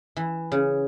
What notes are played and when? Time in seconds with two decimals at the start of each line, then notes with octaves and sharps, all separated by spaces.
0.16 E3
0.52 C#3